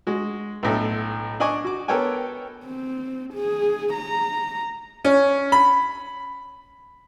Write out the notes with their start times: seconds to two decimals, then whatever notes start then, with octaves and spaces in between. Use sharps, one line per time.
0.07 G#3 F#4
0.63 B1 A2 A3
1.40 D4 D5 D#5 G#5 C#6
1.64 F#4 D6
1.88 B3 A4 A#4 C#5 G5 G#5
2.65 C4
3.34 G#4
3.93 A#5
5.05 C#4
5.52 B5